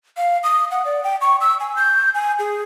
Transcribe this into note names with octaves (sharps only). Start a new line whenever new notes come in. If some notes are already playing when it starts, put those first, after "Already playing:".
F5
D#6
F#5
D5
G5
C#6
E6
G#5
G6
G#5
G#4